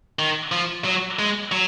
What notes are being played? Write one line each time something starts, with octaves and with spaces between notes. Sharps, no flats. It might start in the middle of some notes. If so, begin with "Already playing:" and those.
D#3
F3
F#3
G#3
F#3